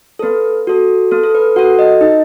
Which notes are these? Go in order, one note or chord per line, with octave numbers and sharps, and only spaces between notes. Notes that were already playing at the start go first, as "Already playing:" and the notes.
A4
B3 B4
F#4 A4
B3 A4
A4
B4
F#4 A4 F#5
D#5
D#4 D#5